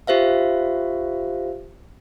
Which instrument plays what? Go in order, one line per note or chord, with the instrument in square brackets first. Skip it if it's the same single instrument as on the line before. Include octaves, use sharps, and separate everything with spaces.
[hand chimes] F4 G4 C5 E5 F5